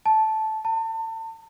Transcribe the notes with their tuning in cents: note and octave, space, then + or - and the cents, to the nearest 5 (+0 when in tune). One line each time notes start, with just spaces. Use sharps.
A5 -10
A5 +35